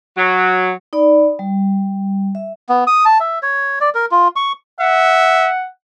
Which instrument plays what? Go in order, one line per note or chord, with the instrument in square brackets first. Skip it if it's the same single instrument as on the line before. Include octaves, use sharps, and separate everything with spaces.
[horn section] F#3
[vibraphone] D#4 D5 B5
G3
E5
[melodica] B3
D#6
A5
E5
C#5
D5
A#4
F4
C#6
[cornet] E5 [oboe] F#5